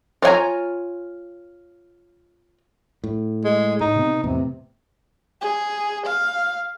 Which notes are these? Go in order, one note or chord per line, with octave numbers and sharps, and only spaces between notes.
F4 C#5 F#5 G#5 A#5
A2
G#3
A2 D#4
C3 B3
E2 A2 C3 B3
G#4
F5